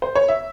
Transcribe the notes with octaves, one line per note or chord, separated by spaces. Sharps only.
C5
C#5
E5